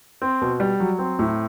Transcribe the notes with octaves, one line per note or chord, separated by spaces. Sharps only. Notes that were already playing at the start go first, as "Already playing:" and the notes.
C4
B2
G3
F#3
C4
A2